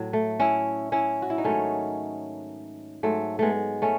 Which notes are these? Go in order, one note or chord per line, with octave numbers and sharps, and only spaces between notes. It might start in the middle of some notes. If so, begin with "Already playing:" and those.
Already playing: A2 F#3
A3
C#4 E4
C#4 E4
F#4
E4
D#4
G#2 D#3 F#3 A3 C#4
G#2 F#3 A3
G#3 A3 B3
A3 C#4